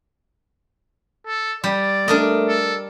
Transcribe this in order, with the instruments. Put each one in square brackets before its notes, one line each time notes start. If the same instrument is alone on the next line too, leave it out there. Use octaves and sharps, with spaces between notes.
[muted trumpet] A4
[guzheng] G3 [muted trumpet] D5
[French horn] A3 [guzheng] D4 A#4 D#5
[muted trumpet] A4